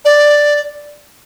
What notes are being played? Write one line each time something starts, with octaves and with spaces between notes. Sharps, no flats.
D5